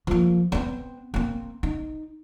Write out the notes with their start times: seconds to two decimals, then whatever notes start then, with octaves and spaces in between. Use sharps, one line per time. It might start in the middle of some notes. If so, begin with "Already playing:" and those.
0.07 F3 A#3
0.52 B3 C4
1.14 A#3 C4
1.63 D#4